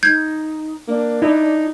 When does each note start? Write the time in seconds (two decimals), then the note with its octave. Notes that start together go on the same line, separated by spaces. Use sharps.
0.03 D#4 G6 G#6
0.88 A#3 D4
1.22 D#4 E4